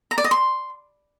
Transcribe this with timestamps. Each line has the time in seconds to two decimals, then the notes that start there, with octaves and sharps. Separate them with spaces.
0.11 A#5
0.18 D5
0.24 D#5
0.31 C6